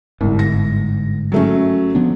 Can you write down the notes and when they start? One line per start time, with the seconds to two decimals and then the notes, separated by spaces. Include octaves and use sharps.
0.21 G1 C2 G#2
0.39 A#6
1.32 F#3 A3 C#4
1.95 F3 B3 D4